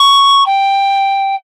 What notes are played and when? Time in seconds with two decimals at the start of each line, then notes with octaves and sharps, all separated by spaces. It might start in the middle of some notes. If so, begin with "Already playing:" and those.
Already playing: C#6
0.46 G5